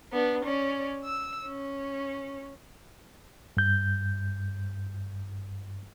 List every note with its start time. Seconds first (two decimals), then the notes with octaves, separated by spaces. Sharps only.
0.12 B3 D4
0.45 C#4 D5
1.04 E6
1.46 C#4
3.57 G2 G6